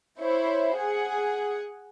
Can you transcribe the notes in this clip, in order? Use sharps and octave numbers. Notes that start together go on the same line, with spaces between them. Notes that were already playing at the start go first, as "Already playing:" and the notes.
E4 C5 C#5
G#4 F#5